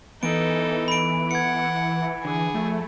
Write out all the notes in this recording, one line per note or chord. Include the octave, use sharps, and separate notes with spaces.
E3 B3 D#4 A4 B4 D7
B5 D7
F#5 G#6 C#7
D3 G#4
F2 A3